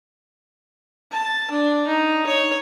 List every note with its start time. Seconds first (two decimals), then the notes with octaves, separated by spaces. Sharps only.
1.11 A5
1.50 D4
1.87 D#4
2.26 C#5